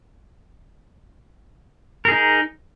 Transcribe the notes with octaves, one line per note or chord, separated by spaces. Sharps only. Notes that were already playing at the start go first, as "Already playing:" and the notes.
D#4 G#4 A#4